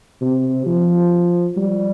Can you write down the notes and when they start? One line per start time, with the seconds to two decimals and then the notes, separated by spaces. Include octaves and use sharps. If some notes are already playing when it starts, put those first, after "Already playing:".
0.22 C3
0.66 F3
1.57 G3